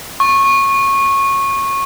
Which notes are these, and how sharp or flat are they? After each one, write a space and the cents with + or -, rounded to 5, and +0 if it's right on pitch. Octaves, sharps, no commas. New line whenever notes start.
C#6 -20